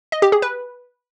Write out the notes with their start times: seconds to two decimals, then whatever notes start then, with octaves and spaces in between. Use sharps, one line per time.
0.12 D#5
0.22 G4
0.32 G#4
0.42 B4